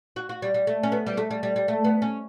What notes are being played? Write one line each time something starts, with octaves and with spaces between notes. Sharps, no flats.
F#4
F#4
G3
G3
A3
C#4
B3
G3
A3
G3
G3
G3
A3
B3
C#4